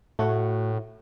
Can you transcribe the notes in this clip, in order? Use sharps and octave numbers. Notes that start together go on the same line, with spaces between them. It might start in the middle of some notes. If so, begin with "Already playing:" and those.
A2 A3 F#4 F#5